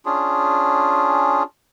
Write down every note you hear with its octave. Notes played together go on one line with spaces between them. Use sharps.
C#4 D4 F4 G#4